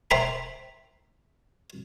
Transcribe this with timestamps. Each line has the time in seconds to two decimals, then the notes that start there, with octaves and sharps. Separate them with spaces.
0.11 C5 E5 G5 A#5 B5